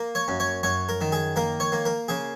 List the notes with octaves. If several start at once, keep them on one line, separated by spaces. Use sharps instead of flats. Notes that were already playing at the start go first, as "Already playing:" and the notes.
Already playing: A#3
C#5
F#2
C#5
F#2 C#5
A#4
D#3
G#4
A#3 A#4
C#5
A#3
A#4
C#3 G#4